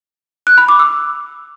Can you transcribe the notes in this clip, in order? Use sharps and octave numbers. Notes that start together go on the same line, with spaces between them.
F#6
B5
D6
E6